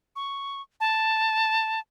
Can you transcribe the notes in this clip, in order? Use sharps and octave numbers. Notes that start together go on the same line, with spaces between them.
C#6
A5